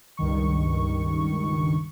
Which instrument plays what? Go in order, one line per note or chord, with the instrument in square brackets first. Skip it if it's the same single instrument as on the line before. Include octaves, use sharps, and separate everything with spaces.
[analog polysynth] C#2 G2 D#3 C#6